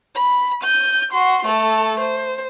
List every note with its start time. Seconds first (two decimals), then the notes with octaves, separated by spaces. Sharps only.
0.15 B5
0.63 G6 D#7
1.11 F#4 C6
1.46 A3 A4
2.00 C5